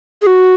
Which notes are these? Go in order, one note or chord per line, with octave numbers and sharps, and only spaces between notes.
G#4
F#4